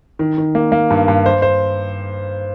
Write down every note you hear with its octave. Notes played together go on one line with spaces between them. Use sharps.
D#3
D#3
A#3
A#3
G2
G2
C5
C5